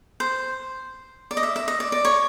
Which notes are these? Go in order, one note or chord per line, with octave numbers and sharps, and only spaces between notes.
C5
D5
D#5
E5
E5
D#5
D5
D5
C#5